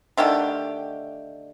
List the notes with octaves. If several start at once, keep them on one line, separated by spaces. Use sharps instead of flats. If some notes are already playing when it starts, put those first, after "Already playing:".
D3 D#3 A3 G4